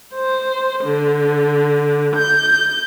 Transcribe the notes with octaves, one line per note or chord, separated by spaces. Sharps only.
C5
D3
G6